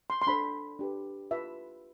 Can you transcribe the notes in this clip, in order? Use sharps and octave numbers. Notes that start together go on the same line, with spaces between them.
C6
C6
D4 A4 C5 B5
D4 G4 B4
F4 B4 E5